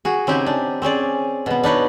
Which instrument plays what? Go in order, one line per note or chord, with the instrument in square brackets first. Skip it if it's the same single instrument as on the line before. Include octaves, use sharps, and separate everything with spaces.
[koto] F#4 G#4
C#3 C4 D#4 G4 G#4
D4
C4 C#4 G#4 D5
B2 B3
D4 D#4 B4 C#5